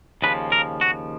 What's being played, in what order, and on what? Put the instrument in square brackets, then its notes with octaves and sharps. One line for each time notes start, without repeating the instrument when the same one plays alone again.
[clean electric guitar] D#2 C#3 F3 B4
A#4
F#4